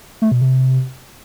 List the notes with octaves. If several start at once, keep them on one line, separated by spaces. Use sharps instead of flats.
A3
B2
C3